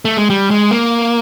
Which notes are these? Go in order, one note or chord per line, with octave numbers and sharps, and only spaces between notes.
A3
G#3
G3
G#3
A#3